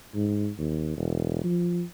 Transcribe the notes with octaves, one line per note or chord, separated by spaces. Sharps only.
G#2
D#2
E1
F3